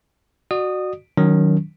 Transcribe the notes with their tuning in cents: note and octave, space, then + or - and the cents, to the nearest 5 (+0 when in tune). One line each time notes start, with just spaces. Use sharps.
F#4 +0 D5 +40 D#6 -10
D#3 +0 F#3 +0 C#4 +30